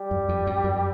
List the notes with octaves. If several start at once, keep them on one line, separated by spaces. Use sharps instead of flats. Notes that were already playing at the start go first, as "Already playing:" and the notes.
Already playing: G3
F#2
F2
F#2
F#2